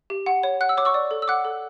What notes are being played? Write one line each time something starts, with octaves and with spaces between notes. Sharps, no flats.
G4
F#5
C#5
F#5 F#6
E6
C#5 D6
C#6 E6
D5
A4
E6
F#5 D6 F#6
A4